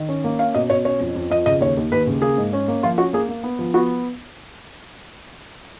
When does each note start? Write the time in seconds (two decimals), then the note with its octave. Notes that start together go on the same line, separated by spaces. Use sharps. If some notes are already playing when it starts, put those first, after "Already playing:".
Already playing: D#3
0.09 C#4
0.24 A#3
0.39 C#4 F5
0.54 B2 D#5
0.70 B2 C#5
0.85 C#4 C#5
1.00 F2
1.16 F2
1.30 F2 D#5
1.46 C#3 D#5
1.61 D#2 C#5
1.77 D#2
1.92 D#2 B4
2.07 C#3
2.22 A#3 G#4
2.37 G#2
2.53 C#4
2.68 A#3
2.83 F3 F4
2.98 C#4 F#4
3.13 A#3 G#4
3.29 A#3
3.44 B3
3.59 F3
3.74 B3 F#4